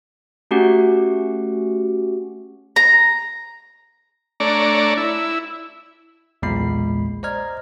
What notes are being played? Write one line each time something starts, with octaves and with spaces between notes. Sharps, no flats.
A3 C#4 F#4 G4 F#5
A#5
A3 D4 C#5 D5 A#5
E4
B1 E2 A#2 G#3 B5 C7
C5 D5 D#5 A#5 F6 G#6